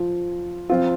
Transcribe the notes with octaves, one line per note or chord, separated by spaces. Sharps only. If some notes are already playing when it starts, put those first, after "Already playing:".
Already playing: F3 F4
F3 C4 F4